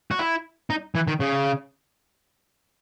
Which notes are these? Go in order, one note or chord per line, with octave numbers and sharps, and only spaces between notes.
F#4
E4
D#4
E3
D#3
C#3